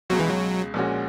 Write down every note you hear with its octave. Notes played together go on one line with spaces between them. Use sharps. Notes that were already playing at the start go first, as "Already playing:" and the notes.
C#2 B2 F#3 G#3
E3
F#3
A#1 A#2 G#3 C#4 F#4